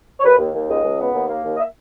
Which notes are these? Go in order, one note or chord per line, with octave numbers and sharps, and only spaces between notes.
C#5
D#2 B4
D#2
D#2
C#2 D#5
C#2
B3
D#2
A#3
D#2
D#5
E5